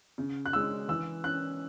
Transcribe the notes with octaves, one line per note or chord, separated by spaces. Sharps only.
C#3
F#6
G#3 C#4 E6
E3 E6
C#4 F#6